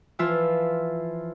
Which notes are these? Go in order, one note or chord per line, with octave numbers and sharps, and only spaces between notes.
E3 F3 F4 E5